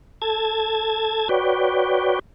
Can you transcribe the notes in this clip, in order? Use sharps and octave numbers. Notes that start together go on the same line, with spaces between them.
A4 A5 G#6
F#4 B4 C#5 D5 G5